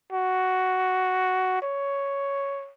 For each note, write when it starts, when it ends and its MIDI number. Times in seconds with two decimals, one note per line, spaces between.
0.12 1.59 66
1.62 2.72 73